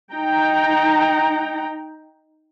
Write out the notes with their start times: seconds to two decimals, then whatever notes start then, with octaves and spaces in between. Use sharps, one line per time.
0.14 D#4 G5 A#5